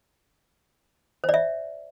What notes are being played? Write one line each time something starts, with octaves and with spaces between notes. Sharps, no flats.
C5
D5
E5